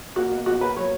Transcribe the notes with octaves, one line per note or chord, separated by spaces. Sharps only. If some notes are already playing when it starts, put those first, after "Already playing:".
A#3 F#4
B2
B2 F#4
A#3 B4
F#3 C#5